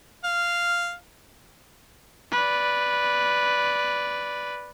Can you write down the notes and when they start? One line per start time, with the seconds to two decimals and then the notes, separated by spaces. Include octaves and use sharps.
0.24 F5
2.32 B4 D5